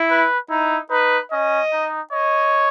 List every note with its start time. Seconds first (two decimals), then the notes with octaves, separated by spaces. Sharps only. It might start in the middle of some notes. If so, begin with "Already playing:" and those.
Already playing: E4
0.11 B4
0.50 D#4 E4
0.91 D#4 B4
1.32 C#4 D#5
1.73 D#4
2.12 C#5 D#5